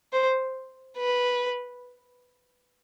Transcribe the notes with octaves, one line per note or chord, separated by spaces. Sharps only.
C5
B4